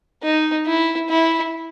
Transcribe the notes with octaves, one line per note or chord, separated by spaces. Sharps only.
D#4
E4
E4